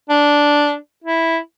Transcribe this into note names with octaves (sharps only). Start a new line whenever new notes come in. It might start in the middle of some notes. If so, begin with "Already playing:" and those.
D4
E4